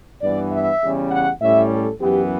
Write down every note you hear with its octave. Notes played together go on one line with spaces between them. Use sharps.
G2 E3 B3 D5
E5
E2 C#3 G3 C#4
F#5
A2 G3 C#4 E5
A4
F#2 E3 B3 G4